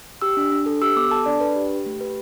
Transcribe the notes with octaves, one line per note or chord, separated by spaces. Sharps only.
G4 E6
D4
D4
A4
G4 E6
B3 D6
A4 A5
D4 D5
D4 B4
G4
G4
A3
G4 B4